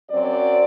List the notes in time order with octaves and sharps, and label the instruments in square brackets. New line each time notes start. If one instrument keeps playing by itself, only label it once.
[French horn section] F#2 F#3 C4 D5